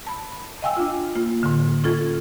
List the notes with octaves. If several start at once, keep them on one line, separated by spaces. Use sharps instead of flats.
A5 B5
D#5 F5 G5 G#5 E6
D4 F4
A#3 F4
A2 D3
C#4 F4 A4 G#6